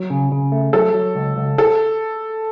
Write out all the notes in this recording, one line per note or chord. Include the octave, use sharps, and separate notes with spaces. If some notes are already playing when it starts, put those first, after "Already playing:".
Already playing: F#3
C#3
C#3
A3
F#3 A4
F#3
C#2
C#2
A4